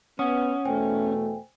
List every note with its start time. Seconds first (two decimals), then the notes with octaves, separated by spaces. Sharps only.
0.19 B3 C#4 F#5 D#6
0.65 E2 B2 A3 C5 G5 G#5